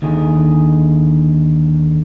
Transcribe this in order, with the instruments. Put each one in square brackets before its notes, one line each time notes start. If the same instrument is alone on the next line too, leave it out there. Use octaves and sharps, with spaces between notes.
[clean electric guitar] D#2 D3 D#3 G#4